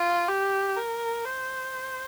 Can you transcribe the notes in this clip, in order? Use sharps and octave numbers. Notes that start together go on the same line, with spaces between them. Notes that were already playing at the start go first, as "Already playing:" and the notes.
Already playing: F4
G4
A#4
C5